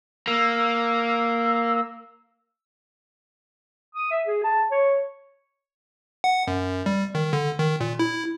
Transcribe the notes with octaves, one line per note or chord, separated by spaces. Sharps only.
A#3 E6
D#6
E5
G#4
A5
C#5
F#5
F#2
G3
D#3
D3
D#3
A#2
E4